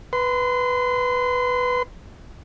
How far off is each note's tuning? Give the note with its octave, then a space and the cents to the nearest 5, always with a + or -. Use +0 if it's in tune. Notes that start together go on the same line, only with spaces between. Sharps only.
B4 +0 C6 -25